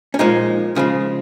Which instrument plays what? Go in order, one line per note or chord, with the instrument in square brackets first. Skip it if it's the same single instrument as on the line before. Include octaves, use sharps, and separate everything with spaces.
[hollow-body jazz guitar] C#4
A#2 F3 G#3 D#4
C#3 F3 G#3